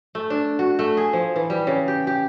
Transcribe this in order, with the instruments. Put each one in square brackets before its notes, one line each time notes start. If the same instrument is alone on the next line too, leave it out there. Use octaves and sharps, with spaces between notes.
[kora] A3
D4
F#4
A3
G#4
F3
E3
G3
C#3
G4
G4